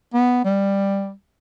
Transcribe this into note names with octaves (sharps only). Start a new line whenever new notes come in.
B3
G3